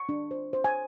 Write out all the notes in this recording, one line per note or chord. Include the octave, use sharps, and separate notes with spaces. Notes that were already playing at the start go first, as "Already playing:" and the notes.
Already playing: C#6
D4
C5
C5
G#5